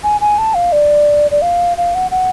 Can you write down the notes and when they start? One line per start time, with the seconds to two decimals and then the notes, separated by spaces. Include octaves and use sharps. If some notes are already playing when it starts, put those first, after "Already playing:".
0.03 G#5
0.21 G#5
0.38 A5
0.54 F5
0.72 D5
1.31 D5
1.42 F5
1.77 F5
1.95 F#5
2.11 F#5